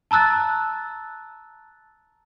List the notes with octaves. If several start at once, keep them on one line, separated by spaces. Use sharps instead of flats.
A5 A#5 E6 F#6 A6